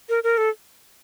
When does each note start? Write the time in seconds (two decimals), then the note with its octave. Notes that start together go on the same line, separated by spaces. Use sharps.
0.09 A#4
0.24 A#4
0.38 A4